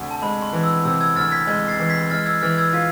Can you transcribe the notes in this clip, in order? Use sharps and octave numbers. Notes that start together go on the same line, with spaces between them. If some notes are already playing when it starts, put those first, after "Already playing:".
Already playing: D2 C3 G#5
A5
G#3 B5
C6
E3
E6
C3 E6
E6 G#6
D2 F6 A6
G#6 B6
G#3 G#6 B6
A6 C7
E3 C7
G#6 B6
G#3 F6 A6
E6 G#6
E3 F6 A6
E6 G#6
F4 G#6 B6